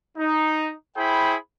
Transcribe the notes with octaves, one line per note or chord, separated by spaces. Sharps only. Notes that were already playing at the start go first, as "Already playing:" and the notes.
D#4
E4 G#4 C5 G5 B5